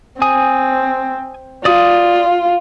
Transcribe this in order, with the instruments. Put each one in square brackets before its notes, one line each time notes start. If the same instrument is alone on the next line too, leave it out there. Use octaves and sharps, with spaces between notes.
[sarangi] C4 [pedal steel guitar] G#5 D#6
[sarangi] F4 [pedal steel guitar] D5 D#6